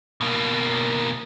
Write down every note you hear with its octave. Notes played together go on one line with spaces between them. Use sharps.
B2 A#3